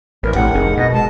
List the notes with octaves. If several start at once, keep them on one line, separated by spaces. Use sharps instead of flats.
A1 E2 B3 A#4
A#1 A2 C3 G4 F#5
F1 D#4 G#4 A#4
B2 D#5
G#3 A5